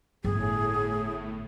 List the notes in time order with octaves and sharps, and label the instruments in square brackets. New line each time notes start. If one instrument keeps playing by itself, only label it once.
[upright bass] G1 [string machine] A2 [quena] G#4